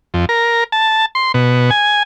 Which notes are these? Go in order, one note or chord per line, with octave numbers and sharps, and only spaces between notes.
F2
A#4
A5
C6
B2
G#5